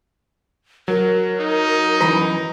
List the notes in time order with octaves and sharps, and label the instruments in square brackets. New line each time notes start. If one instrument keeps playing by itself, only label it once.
[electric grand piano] F#3 [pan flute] A#4
[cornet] D#4
[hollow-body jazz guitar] F#2 E3 B4 [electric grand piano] A#5